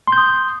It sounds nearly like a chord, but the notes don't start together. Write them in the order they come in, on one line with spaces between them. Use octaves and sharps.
C6 G6 D#6